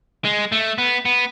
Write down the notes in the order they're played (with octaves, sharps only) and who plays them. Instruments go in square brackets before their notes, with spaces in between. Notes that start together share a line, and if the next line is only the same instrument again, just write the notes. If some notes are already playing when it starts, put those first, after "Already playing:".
[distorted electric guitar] G#3
A3
B3
B3